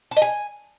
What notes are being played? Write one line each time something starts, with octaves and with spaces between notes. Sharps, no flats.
A5
D#5
G#5